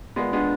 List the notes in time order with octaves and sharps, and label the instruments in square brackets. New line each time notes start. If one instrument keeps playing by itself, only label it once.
[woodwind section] A#2 [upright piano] G#3 B3
[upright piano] G#3 B3 [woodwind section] D4